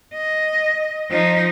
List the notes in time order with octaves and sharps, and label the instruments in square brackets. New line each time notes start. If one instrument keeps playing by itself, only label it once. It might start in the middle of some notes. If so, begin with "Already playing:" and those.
[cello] D#5
F3 D#4